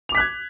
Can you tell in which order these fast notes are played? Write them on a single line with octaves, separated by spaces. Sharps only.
F7 D6 B6 F#6 G#6